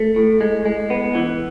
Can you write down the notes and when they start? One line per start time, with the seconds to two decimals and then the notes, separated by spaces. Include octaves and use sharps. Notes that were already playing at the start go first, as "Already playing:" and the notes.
Already playing: A3
0.16 A2
0.41 G#3
0.66 G#3
0.90 B3
1.15 E3